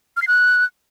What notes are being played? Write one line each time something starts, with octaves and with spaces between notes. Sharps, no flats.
F6
C7
F#6